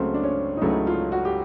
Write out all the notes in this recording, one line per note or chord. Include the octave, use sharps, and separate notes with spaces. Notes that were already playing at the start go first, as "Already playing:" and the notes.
Already playing: C#2 C#3 F#3 A3 C4
D4
C#4
D#4
C#2 C#3 F#3 A3 E4
F4
F#4
G4